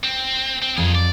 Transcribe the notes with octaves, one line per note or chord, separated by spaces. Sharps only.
C4
C4
F2 A#3 G#4
D5